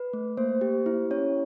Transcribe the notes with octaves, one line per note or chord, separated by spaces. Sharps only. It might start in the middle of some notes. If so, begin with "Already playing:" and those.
Already playing: B4
A3
A#3 C5
G4
E4
C#4 C#5